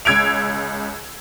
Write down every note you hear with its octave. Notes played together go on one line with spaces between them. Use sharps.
C#2 E6 G#6 D7 F7